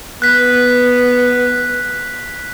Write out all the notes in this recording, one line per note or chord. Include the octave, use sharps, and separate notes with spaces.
B3 F#6 B6